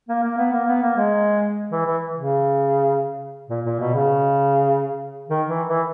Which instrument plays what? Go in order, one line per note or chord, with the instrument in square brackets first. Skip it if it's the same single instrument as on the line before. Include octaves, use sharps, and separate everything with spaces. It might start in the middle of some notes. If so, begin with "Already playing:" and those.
[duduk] A#3
A#3
B3
A#3
B3
A#3
G#3
E3
E3
C#3
A#2
A#2
B2
C#3
D#3
E3
E3